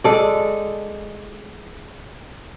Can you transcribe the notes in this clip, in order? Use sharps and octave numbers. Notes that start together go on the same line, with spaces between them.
G#3 A4 D5